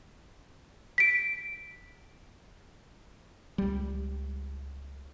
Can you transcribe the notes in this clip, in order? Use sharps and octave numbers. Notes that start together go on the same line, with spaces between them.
B6 D7
C#2 G3